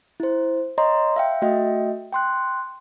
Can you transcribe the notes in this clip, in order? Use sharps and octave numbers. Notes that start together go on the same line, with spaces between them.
E4 C5
C#5 D#5 A#5 C6
E5 F5 G5
A3 F#4 D#5 E5 G5
G5 C6 F#6